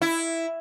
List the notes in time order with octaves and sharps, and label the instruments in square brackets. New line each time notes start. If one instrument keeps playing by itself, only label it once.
[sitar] E4